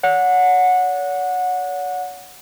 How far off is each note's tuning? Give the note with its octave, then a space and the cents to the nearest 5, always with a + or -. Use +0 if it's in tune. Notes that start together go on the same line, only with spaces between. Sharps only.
C#5 +40 F#5 -20